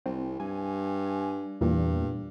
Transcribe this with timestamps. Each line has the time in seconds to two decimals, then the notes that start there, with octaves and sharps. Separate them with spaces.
0.06 C2 C4
0.40 G2 G#5
1.61 E2 G2 A#2